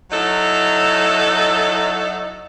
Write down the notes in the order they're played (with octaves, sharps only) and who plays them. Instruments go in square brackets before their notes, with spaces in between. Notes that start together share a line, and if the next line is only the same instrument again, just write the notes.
[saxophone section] F#3 D#4 E4 A4